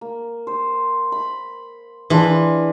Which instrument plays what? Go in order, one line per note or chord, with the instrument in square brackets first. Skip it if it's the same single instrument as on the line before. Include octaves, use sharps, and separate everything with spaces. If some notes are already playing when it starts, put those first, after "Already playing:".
[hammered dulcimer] A#3
C5
B5
[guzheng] E3 [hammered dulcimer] D4 F4 G#4